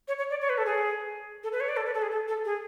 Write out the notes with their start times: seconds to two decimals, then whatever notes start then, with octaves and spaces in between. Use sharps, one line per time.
0.08 C#5
0.18 C#5
0.30 D5
0.41 C#5
0.49 B4
0.58 A4
0.66 G#4
1.43 A4
1.52 B4
1.60 C#5
1.69 D5
1.77 A4
1.86 B4
1.94 A4
2.02 G#4
2.11 A4
2.28 A4
2.45 G#4